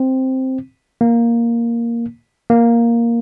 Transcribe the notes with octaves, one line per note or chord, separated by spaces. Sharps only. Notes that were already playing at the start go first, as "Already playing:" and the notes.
Already playing: C4
A#3
A#3